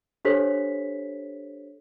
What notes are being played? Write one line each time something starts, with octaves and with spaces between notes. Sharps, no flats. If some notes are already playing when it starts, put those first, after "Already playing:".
D4 G4 A4 C5 C#5 B6